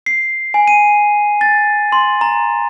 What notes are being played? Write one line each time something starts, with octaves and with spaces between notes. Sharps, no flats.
C7
G#5
D#7
A6
C6
A#5